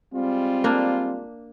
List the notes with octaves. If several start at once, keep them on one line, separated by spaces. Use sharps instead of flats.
G3 G#3 C4 F4
A#3 D4